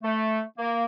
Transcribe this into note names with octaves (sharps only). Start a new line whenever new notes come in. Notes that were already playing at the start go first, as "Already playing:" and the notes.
A3
A#3